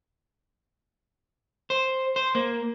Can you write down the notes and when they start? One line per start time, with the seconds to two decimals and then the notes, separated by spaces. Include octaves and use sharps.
1.70 C5
2.16 C5
2.35 A#3